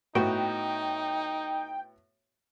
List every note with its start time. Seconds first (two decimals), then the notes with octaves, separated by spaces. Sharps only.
0.15 A2 B3 D#4 F#4 G5